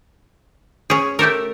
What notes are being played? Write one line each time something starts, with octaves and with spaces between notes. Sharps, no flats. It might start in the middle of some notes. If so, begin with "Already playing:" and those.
C#4 G#4
A3 G4 A4 A#4